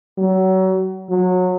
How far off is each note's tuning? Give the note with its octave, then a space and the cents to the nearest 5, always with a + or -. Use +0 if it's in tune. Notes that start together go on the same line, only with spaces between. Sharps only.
F#3 +30
F#3 -25